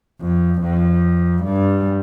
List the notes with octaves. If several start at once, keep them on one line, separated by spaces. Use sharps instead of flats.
F2
F2
G2